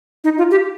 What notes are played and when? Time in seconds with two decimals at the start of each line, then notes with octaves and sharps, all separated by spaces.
0.24 D#4
0.38 F4
0.51 G4